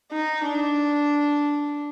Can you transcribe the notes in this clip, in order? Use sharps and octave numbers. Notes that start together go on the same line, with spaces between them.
D#4
D4